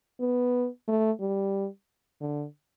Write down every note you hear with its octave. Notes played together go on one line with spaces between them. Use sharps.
B3
A3
G3
D3